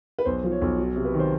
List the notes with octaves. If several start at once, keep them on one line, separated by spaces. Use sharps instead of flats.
B4
B1 C5
F3
C#5
B1
F#3
C3
B4
D#3
C5